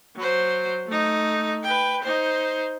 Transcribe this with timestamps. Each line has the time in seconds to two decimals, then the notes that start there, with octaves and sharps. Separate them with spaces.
0.17 F#3 C5
0.87 A3 D#4
1.63 B4 G5
2.03 D#4 C5